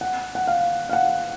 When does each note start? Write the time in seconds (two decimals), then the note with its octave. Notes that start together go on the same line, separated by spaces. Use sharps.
0.01 F#5
0.35 F#5
0.47 F5
0.89 F5
0.93 F#5